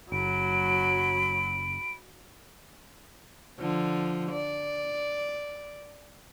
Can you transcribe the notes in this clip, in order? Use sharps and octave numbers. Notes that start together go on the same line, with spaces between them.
F#1 F#3 B5 D7
D3 F3
D5